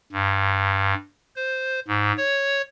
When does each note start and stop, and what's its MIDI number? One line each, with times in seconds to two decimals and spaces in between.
0.13 0.94 43
1.36 1.80 72
1.88 2.13 44
2.18 2.62 73